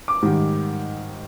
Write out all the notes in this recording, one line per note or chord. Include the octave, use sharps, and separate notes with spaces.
D6
G#2 D#3 G3